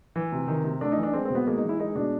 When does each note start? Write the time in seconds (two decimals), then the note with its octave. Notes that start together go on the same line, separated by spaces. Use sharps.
0.16 E3
0.32 C3
0.48 D#3
0.64 C3
0.81 A3 D4
0.92 D#4
0.97 E3
1.03 D4
1.13 G#3 C4
1.25 B2 C4
1.35 B3
1.47 G#3 A#3
1.58 D#4
1.64 E3
1.69 E4
1.80 G#3 D#4
1.95 B2 D4